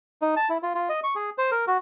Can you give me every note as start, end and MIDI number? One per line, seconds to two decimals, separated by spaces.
0.22 0.35 63
0.37 0.49 81
0.49 0.58 64
0.63 0.74 65
0.75 0.89 65
0.89 1.00 75
1.04 1.14 85
1.15 1.30 68
1.38 1.51 72
1.52 1.65 70
1.67 1.77 66